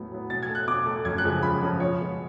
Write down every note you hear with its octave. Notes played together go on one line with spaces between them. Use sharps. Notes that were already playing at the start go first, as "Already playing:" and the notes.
Already playing: A2 F#3 B3
F#3 B3
B2 A6
G#6
A3
F#6
B2 D6
A3
F#2 G#6
F#6
C#3 F3 G#3
F#2 B5
C#3 F3 G#3
B2 C#5
G#3 B3